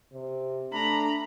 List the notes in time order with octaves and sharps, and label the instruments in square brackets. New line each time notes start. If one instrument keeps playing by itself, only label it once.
[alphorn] C3
[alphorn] A3 [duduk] D4 [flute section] A#5 [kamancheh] B5